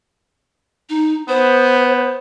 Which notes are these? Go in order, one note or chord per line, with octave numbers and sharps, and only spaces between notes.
D#4
B3 C5